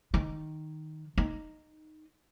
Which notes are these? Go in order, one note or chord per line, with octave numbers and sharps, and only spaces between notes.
D#3
D#4